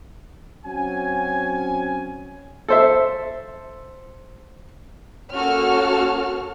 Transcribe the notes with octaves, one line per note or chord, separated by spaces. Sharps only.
F#3 C4 C#4 G#5
A4 C5 E5
A#3 C#4 F#4 A4 F6